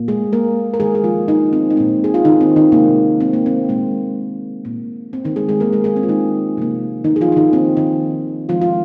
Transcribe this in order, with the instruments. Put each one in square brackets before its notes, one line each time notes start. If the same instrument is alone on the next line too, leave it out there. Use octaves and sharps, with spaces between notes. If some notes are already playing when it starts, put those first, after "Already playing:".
Already playing: [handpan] A#2 A#3
G#3 G#4
A#3 A#4
A#4
D#3 G#3 G#4
G#4
F3 F4
D#3 D#4
C4
D#4
A#2 G#3 C4
G#4
F4
D#3 D#4
C4
D#3 D#4
C3 G#3 A#3
C4
A#3
C4
A#2 G#3 A#3
A#2 A#3
C4
D#3 D#4
G#3 G#4
G#3 G#4
D#3 G#3 A#3 A#4
G#3 G#4
G#3 G#4
C4
F4
D#3 D#4
C3 F3 A#3
D#3 D#4
G#4
F3 F4
F4
D#3 D#4
D#3 A#3 C4
D#3 D#4
D#3 F3 G#3 F4
F4